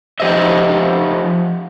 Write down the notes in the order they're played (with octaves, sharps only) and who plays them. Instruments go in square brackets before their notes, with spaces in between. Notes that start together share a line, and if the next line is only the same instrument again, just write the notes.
[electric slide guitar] F3 G4 C5 D#5 E5